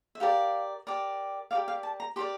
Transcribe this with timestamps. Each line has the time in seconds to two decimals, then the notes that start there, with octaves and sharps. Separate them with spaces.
0.15 E5
0.20 G4 A#4 D5 F5
0.87 G4 A#4 D5
1.51 G4 A#4 D5 F5
1.68 F5
1.83 A5
2.00 A#5
2.16 G4 A#4 D5 C6